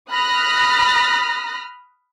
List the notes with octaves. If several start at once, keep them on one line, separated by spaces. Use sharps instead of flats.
B5 D#6 F6 F#6 A#6 B6